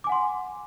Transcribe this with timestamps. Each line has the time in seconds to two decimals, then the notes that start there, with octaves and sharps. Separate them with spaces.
0.04 D6
0.07 G#5
0.09 F#5
0.12 C6